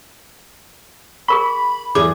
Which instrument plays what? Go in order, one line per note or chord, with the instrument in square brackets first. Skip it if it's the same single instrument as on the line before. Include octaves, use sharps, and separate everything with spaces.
[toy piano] G#4 A#4 C#6 [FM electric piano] B5
[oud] E2 G#4 [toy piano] D6